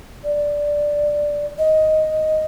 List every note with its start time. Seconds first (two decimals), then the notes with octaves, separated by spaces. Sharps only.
0.24 D5
1.58 D#5